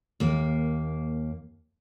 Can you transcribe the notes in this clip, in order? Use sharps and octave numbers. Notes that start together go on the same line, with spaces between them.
D#2 A#3